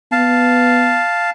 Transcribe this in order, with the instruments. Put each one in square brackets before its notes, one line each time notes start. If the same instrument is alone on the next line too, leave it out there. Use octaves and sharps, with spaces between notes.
[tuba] B3 [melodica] F5 A5